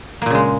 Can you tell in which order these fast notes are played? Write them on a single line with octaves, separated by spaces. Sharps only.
A#3 A#2 C#3 G#3